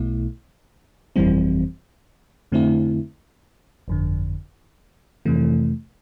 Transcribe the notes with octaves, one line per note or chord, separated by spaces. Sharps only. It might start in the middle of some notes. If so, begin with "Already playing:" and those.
Already playing: B1 B2 A3 E4
G1 F2 E3 G3 C4
F2 D3 A3 C4 E4
G1 F2 D3
F2 C3 E3 A3